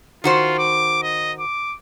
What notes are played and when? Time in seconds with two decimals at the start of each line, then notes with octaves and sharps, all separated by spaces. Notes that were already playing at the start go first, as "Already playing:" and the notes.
0.24 D#3 F4 F#4 C5
0.58 D6
1.03 D#5
1.40 D6